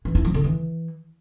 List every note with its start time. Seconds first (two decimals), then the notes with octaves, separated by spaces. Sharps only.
0.05 E3
0.15 E4
0.25 F3
0.34 D3
0.44 E3